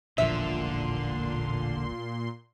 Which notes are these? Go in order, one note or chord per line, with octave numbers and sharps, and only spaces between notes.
E1 A1 A#2 D3 F3 E5 C6